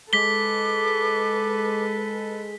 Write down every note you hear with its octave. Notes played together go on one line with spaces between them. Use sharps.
G#3 A4 B4 D6 B6 G7